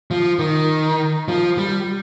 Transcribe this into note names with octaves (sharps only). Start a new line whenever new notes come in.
F3
D#3
F3
G3